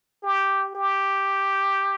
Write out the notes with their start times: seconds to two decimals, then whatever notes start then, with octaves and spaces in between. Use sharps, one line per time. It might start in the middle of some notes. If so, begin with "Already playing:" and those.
0.23 G4
0.75 G4